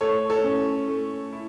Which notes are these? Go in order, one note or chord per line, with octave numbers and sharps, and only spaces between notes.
A3 A4 C#5
A4 C#5
C#4
A3
E4